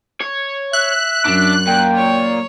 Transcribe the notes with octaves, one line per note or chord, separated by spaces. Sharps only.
C#5
E5 F#6
F#2 D4
A#2 G5
C#5